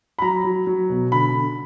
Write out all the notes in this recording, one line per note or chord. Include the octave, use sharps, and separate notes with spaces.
B5
F#3 A#5
F#3
F#3
B2
D3 B5
D3